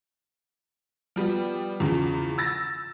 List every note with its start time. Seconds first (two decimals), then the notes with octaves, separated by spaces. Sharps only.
1.16 F3 G3 B3
1.80 E2 C#3 F3
2.38 E6 A6 A#6